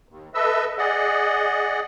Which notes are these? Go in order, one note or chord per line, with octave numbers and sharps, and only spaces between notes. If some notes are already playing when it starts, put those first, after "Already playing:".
D#2
A4 B4 D#5 E5 E6
G#4 D5 D#5 F#5